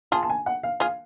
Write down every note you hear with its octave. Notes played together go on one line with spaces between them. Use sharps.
F4 G#4 A5
A5
G#5
F#5
F5
F4 G#4 F5